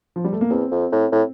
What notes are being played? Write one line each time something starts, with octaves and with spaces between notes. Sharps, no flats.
F3
G3
A3
A#3
E2 C4
F2
A2
A2